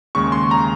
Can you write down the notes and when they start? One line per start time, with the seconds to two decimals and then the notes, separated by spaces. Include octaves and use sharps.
0.15 D#2 C#3 G#3 C#6
0.32 C6
0.51 A#5